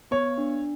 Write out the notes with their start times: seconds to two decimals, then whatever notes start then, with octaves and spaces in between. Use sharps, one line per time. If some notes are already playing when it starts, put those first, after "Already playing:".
0.11 B3 C#5
0.38 D4